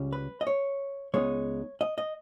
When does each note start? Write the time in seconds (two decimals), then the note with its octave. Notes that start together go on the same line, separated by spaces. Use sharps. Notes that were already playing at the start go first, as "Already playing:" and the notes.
Already playing: C#2 C#3 G3 C#4
0.13 B4
0.41 D#5
0.47 C#5
1.14 C#2 C#3 G#3 B3 D#4 C#5
1.81 D#5
1.98 D#5